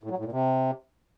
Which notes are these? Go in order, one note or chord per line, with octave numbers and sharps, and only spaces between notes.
A2
F#3
A2
A#2
C3